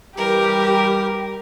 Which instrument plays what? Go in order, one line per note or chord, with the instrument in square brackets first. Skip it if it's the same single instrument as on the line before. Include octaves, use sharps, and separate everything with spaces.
[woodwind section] E3 G3 [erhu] G4 [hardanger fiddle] A#4